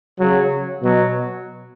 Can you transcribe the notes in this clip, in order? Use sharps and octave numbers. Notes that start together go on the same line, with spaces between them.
C#3 F#3
B2 F#3